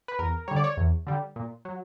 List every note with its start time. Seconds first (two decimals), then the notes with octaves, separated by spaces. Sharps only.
0.08 B4
0.19 E2 A#4
0.48 D3 G3 C#5
0.56 D5
0.64 C#5
0.77 E2
1.07 D3 G3
1.36 A#2
1.65 F#3